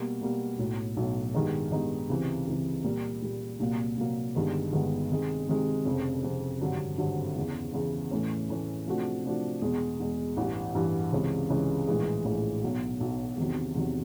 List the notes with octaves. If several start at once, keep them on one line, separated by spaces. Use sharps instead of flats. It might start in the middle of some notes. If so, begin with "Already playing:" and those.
Already playing: B2 G3 A#3
B2 G3 A#3
B1 A2 F#3
B1 A2 F#3
G2 D#3 G#3 B3 D#4
G2 D#3 G#3 B3 D#4
C#2 C3 E3
C#2 C3 E3
A#2 G3 A#3
A#2 G3 A#3
C2 A#2 F#3 A#3
C2 A#2 F#3 A#3
G1 G2 D#3 G#3 B3
G1 G2 D#3 G#3 B3
C3 D#3 G#3
C3 D#3 G#3
F1 F2 C#3
F1 F2 C#3
G#1 G2 D3 F#3
G#1 G2 D3 F#3
E2 C#3 E3
E2 C#3 E3
A2 E3 A3 C#4
A2 E3 A3 C#4
C3 F3 A3 D4 F#4
C3 F3 A3 D4 F#4
E2 B2 G#3
E2 B2 G#3
A1 G2 E3
A1 G2 E3
C#2 C3 E3 G#3 C#4
C#2 C3 E3 G#3 C#4
A#1 A2 E3 G#3
A#1 A2 E3 G#3
B1 B2 F#3
B1 B2 F#3
E2 C3 D#3 F#3
E2 C3 D#3 F#3